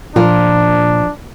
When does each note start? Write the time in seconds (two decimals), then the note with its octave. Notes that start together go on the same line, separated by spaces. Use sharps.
0.16 A#2 F3 D4 F4 A#4